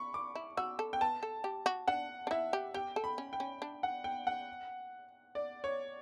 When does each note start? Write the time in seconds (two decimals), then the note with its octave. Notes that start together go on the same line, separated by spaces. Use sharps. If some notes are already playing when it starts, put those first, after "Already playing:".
Already playing: B5 C#6
0.14 D6
0.35 E4
0.57 F#4 E6
0.79 A4
0.93 G5
1.01 B4 A5
1.23 A4
1.44 G4
1.66 F#4
1.88 D4 F#5
2.27 D4
2.31 E4 E5
2.53 G4
2.74 G4 G5
2.96 A4
3.04 B5
3.18 C#4
3.33 G5
3.40 C#4
3.62 D4
3.83 F#5
4.04 G5
4.27 F#5
5.35 D5
5.64 C#5